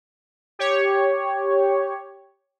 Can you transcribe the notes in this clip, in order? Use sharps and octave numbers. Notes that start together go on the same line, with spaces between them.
G4 C#5